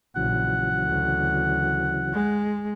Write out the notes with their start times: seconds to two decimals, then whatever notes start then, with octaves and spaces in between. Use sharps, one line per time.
0.16 A#1 C#3 E3 F#3 F#5
0.82 D2
2.13 G#3